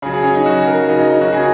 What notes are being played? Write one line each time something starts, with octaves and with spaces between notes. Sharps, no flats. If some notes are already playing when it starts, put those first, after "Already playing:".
C#3 F#3 G#4
G#4
C#4
D#4
C#3 F#3 F#4
A#4
C#3 F#3 D#4
D#4
D#4
F#4
C#3 F#3 G#4